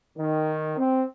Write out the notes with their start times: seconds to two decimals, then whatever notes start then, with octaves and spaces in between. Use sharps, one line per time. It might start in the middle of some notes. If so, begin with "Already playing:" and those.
0.17 D#3
0.78 C4